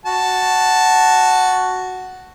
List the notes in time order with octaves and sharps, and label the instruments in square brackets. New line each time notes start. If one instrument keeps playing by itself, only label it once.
[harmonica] F#4 A5